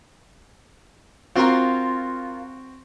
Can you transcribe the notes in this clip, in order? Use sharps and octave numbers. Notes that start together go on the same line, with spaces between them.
C4 F4 F#4 A#4 F5